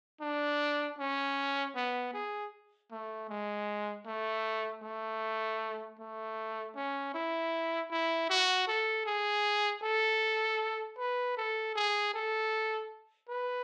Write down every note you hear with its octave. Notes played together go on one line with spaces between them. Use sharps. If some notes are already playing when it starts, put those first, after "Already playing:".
D4
C#4
B3
G#4
A3
G#3
A3
A3
A3
C#4
E4
E4
F#4
A4
G#4
A4
B4
A4
G#4
A4
B4